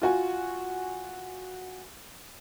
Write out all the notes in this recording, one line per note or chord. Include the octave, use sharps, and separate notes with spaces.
F4 F#4 G#5